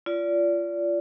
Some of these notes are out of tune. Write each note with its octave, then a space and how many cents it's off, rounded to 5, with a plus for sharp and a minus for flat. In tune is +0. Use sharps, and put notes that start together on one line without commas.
F4 -20 D5 -25